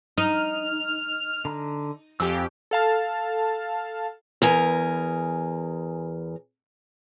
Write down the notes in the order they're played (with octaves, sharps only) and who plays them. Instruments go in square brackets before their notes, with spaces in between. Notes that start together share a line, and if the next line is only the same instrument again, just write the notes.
[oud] D#4 [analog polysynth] F6
[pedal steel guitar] D3 A#5
[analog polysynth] F2 G4 [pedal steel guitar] F5 G#5 E6
[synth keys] A4 F5 A5
[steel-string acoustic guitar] E2 A#4 G#5